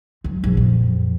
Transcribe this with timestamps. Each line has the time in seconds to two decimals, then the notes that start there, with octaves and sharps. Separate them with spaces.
0.24 F#2
0.44 A#1
0.57 F2